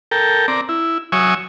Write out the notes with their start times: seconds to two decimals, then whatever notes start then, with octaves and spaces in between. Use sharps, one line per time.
0.11 A4 A#4 G5
0.48 C4 D5 A#5
0.69 E4
1.12 F#3 C#5 E5 G#5 C#6 D#6